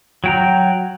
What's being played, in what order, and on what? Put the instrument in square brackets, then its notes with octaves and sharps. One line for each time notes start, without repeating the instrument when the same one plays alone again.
[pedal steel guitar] F#3 G5 A#5